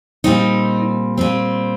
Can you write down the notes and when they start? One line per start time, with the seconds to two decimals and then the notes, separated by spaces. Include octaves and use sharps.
0.24 A#2 G3 C4 D#4
1.17 A#2 G3 C4